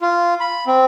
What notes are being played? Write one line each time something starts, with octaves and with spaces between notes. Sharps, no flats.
F4
B5
C4